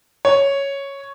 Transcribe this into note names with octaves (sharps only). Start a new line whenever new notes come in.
C#5